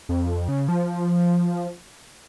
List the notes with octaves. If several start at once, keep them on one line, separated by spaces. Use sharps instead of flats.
F2
C#3
F3